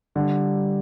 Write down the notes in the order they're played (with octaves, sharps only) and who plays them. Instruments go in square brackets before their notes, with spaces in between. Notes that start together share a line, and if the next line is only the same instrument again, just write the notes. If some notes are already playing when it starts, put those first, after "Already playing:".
[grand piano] D3 [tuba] G3